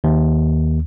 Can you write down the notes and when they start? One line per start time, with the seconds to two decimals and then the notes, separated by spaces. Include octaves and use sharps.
0.04 D#2